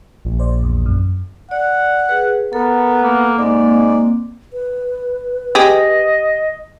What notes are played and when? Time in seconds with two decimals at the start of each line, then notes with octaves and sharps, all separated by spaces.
0.25 A#1
0.40 C5 D5
0.63 E2
0.86 F#2
1.51 D5 F#5
2.09 G#4 B4
2.53 B3 A4 A#4
3.03 A#3
3.38 G#2 A#3 C4 D5
4.53 B4
5.55 G4 G#4 D#5